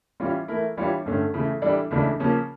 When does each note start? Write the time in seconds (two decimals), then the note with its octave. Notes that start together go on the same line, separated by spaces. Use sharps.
0.20 E3 G3 C#4 F4
0.48 E3 A3 E4 A#4
0.77 E3 G3 D4 F4 C#5
1.06 G2 D3 A3 C#4
1.34 C#3 E3 A3
1.62 E3 G3 D4 A4 D5
1.91 C#2 C#3 E3 A3 D4
2.20 C#3 F3 A#3 C#4